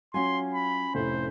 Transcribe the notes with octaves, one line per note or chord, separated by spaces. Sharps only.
F#3 C#4 F4 G#5 C6
B5
F1 A2 C5